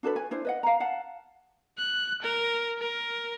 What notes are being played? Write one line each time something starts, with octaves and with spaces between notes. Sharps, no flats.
D4 F#4 A4 B4
G#5
D4 E4 C5
B4 D#5 F#5
F5 A#5
F5 F#5 A5
F#6
A#4
A#4